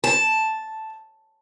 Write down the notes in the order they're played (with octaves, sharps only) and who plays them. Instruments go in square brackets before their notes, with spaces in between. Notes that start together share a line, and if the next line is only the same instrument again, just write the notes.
[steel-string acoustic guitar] A5